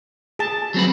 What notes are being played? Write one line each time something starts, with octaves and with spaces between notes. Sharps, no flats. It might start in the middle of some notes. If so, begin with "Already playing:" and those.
G#4 A5
F#3 C4 B4